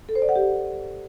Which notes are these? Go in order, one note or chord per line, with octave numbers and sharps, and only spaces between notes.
A4
C5
D5
F#5
G4